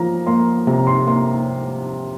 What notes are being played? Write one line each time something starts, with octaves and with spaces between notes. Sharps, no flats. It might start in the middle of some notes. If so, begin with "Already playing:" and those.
Already playing: F3 A#3 A#5
A#3 C6
C3 A#5
C6
A#3 C6